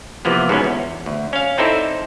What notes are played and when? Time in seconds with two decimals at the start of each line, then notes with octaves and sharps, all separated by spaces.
0.25 C3 E3 F3 A#3 B3
0.49 G#2 B2 B3 C#4
0.64 E2
1.06 D2
1.33 C#4 F5
1.58 C4 D#4 E4 A4 C5 D5